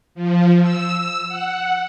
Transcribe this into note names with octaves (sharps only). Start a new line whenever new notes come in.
F3
E6
F#5